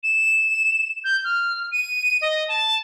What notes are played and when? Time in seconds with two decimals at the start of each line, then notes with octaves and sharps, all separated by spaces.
0.03 E7
1.04 G6
1.24 F6
1.72 D#7
2.21 D#5
2.48 A5